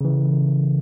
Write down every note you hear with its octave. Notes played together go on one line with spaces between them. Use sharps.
C#3 E3